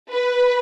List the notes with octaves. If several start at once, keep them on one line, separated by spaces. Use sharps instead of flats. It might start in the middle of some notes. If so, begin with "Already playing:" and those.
B4